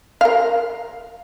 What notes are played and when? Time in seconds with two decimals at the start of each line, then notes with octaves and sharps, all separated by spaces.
0.21 A#4 F5